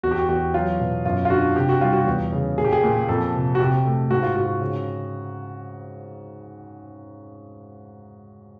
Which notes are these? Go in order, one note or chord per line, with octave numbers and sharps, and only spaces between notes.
E2 F#4
G4
F#4
E2 F#4
F#3 F4
B2
F#2 F4
F4
D3 F#4
C3 G4
F#4
G3 F4
F#4
E2
C#3
A#2 G#4
G4
G#4
A#2
F2 A4
C3
F#4
C3 G4
A3
G#2 F#4
F4
G#2 F#4
C#3